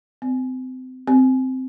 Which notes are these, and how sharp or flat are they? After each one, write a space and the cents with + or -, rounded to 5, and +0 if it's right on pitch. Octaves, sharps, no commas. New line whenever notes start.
C4 -30
C4 -10